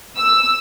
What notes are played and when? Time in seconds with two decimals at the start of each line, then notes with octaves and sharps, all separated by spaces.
0.17 E6